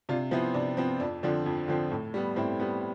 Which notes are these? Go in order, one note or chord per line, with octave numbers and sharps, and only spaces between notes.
C3 D4 F4
F3 B3 C4 E4
C3 D4
F3 B3 C4
F2 D4
D3 F3 C4 D4
F2
D3 F3 C4
A2
G3 B3
A2 C4 E4
G3 B3